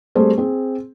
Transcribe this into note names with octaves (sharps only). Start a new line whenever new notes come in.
G3 A3 C4 G#4 C5
C4 G#4